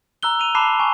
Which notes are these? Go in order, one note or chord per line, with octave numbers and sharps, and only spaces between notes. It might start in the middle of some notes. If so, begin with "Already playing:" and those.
A#5 E6 F#6 G7
D#7 F7
A5 B5 D6 F#6 C7 E7
G#5 C#6